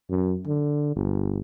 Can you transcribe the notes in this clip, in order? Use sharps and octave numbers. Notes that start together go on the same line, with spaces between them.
F#2
D3
G1